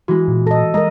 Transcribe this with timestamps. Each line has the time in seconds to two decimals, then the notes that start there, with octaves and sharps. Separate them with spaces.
0.08 E3 G#3 F#4
0.28 A#2
0.47 A4 D#5 A#6
0.74 G#3 A#4 D#5 A#5